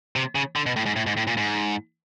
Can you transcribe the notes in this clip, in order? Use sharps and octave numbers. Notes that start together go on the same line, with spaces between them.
C3
C#3
D3
B2
A2
G#2
A2
G#2
A2
A#2
G#2